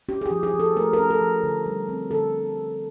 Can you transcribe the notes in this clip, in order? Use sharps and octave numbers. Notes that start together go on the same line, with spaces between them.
C#4 G4
G#4
G4
F3
G#4
F3
A4
A3 A#4
A#4
C#4
A4
F3
D3
G3
C4
D3 A4